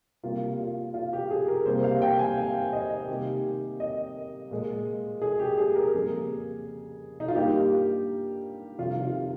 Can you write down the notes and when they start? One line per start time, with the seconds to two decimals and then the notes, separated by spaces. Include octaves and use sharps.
0.23 C3 G3 A#3 F4
0.59 F4
0.94 F4
1.13 G4
1.30 G#4
1.48 A#4
1.65 C3 G3 A#3 C5
1.84 F5
2.02 G5
2.19 G#5
2.37 F5
2.73 D#5
3.08 C3 D#3 G3 A#3 G4
3.80 D#5
4.51 A#2 G#3
5.22 G#4
5.39 G4
5.58 G#4
5.76 A#4
5.93 F2 C#3 G3 A#3 G#4
7.20 D#4
7.28 F4
7.35 G2 G3 A#3 G4
8.78 F2 C3 D#3 G3 F4
9.02 F4